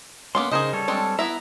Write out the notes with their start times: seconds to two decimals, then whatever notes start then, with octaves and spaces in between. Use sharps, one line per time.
0.35 A#3 B3 C#4 C6 D6
0.51 C#3 D#4 G#4 A#4 C5 D#5
0.73 G3 A4 C#5
0.88 G#3 C4 D4
1.19 B3 E4 E5 A#5